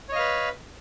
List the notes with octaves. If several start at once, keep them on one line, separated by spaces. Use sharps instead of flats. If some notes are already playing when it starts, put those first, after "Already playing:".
B4 C#5 D#5 F5